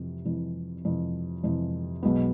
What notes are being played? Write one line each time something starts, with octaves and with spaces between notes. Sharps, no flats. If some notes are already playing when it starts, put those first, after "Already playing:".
Already playing: F2 C3 E3
F2 C3 E3
F2 C3 E3
F2 C3 E3
B1 B2 G#3 B3